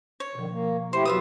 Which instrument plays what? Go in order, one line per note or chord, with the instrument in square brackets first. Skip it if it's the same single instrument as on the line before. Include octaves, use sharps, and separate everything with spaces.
[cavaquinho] C#5
[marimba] B2 F3 [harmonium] D3 D#3
[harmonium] A#3
[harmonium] A3 E4 G4 [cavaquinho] C5
[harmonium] E2 F#3 B4 [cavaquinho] F4 E5 D#6